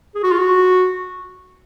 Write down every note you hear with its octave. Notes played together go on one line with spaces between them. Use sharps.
G#4
F#4
F4
F#4